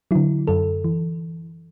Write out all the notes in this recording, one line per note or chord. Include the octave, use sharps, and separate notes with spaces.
D3 F#3 E4
F#2 A4
E3